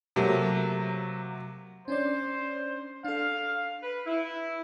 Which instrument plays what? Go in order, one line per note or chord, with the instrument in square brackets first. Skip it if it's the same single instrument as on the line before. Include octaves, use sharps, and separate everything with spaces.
[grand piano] C3 F#3 A3 A#3
[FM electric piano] C#4 D4 D5 [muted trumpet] C5
[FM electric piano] D4 A4 [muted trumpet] F5
[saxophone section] B4
E4